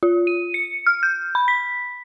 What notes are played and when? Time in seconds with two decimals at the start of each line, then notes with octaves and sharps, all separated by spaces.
0.03 F4
0.27 D#7
0.54 C#7
0.86 F6
1.03 G6
1.35 B5
1.48 B6